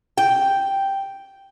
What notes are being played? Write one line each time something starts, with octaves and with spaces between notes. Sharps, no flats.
G5